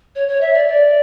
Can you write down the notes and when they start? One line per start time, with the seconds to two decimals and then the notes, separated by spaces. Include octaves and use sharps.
0.15 C#5
0.28 C#5
0.40 E5
0.53 D5
0.68 D5